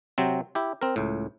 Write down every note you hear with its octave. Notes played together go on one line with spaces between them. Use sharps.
C3 F#3 C4
E4 G4
C4 A#4
C#2 A2